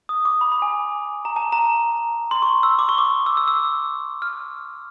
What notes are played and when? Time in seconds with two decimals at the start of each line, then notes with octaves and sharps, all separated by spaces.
0.09 D#6
0.25 D6
0.41 B5
0.52 B5
0.62 G#5
1.25 A#5
1.36 A5
1.52 A#5
2.31 C6
2.42 C#6
2.63 E6
2.79 D6
2.89 C#6
2.98 D6
3.26 E6
3.37 E6
3.48 E6
4.22 F6